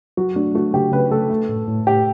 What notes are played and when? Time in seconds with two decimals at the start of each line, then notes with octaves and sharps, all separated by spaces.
0.17 F#3 F#4
0.36 A3 D4
0.55 A3 F#4
0.74 C#3 G4
0.92 C#3 B4
1.11 A3 A4
1.30 A3
1.49 A2
1.68 A2
1.87 A2 G4